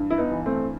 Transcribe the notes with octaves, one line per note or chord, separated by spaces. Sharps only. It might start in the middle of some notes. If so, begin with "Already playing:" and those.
Already playing: G2 E3
E4
B3 D#4
E3
A3 C4